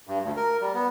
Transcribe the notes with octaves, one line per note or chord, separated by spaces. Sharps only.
G2
D2
A#4
G3
B3